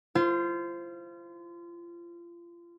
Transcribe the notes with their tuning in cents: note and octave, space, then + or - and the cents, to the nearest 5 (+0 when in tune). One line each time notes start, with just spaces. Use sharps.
F4 -30 C5 +0